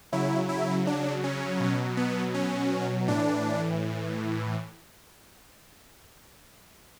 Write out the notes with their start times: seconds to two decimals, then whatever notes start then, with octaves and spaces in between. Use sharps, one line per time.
0.12 C#3 F#3 E4
0.49 E4
0.87 D4
1.24 C#4
1.60 B2 F#3
1.97 B3
2.34 C#4
3.08 A2 E3 D4